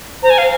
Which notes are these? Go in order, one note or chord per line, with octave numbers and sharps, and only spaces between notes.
C5 A#5
G#5
F5